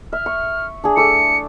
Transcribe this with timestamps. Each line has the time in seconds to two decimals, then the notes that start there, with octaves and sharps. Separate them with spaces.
0.13 E5 F6
0.26 C#6
0.84 D4 G#4
0.97 A3 D6 E6 C#7